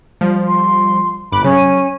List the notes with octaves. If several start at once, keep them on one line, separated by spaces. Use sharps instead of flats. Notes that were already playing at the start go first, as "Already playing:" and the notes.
F3 G3
C6
G1 B5 D6 F#6
C#3 F#3 C#4
D#7